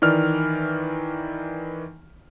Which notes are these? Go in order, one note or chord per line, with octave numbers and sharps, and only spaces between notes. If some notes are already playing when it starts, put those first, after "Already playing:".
D#3 E3 D5 F6